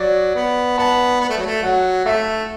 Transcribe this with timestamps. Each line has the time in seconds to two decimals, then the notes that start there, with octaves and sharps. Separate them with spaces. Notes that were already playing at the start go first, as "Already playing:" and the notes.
Already playing: F#3 D5
0.35 B3
0.78 B3 A5
1.21 B3
1.29 A3
1.38 F#3
1.46 A3
1.63 F#3 F#5
2.05 A3 E5